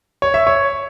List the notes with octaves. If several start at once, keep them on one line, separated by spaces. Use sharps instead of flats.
C#5
E5
C#5